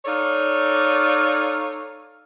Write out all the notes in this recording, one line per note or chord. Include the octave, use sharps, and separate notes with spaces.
D#4 A4 C#5 D5 F5